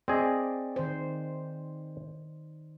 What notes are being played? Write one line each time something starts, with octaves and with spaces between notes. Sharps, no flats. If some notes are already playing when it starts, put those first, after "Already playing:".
C4 G#4 D5 D#5
D#3 C5